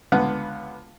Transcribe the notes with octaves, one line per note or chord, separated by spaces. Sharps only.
C#2 D3 B3 F#5